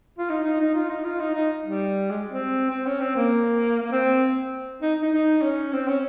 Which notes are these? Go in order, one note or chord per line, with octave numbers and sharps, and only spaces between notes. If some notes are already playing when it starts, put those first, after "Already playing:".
F4
D#4
D#4
D#4
F4
D#4
F4
D#4
D#4
G3
G#3
C4
C4
C#4
C4
A#3
A#3
C4
D#4
D#4
D#4
C#4
C4
C#4